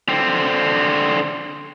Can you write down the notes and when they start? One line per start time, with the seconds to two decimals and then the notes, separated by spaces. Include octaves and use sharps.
0.09 D3 C4